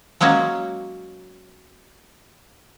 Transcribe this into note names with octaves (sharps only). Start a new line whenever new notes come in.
F#3 G#3 A#3 C#4 F#4